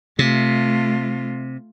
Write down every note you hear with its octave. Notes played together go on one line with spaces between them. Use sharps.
C3 A3 F4